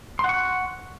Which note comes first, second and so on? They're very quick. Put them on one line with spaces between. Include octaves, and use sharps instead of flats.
C6 F#5 C#6 F#6